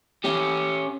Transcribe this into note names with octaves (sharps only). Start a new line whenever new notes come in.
C#4 G4